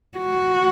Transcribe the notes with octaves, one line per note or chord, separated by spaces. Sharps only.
F#4